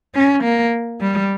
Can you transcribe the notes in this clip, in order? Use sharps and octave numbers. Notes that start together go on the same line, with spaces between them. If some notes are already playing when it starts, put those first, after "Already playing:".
C#4
A#3
G3